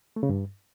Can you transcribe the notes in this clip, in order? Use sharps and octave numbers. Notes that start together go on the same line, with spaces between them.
A3
C#3
G2